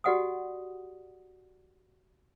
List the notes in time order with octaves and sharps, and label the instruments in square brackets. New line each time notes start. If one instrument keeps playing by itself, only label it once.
[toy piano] F#4 G4 D5 F#5 G#5 D#6